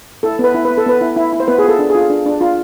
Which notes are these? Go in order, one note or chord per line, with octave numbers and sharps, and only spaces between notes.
E4 A4
B3
B4
E4
B4
B3
A4
B3 B4
E4
E4
E4
C5
B3 B4
G#4
F4
A4
D4
F4 G#4
D4
D4
F4